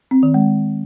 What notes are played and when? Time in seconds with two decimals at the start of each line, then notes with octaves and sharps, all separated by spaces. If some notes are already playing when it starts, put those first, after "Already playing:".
0.11 C4
0.23 D#3
0.34 G#3